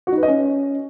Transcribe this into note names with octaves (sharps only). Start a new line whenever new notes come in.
F#4
D#4
B4
D#5
C#4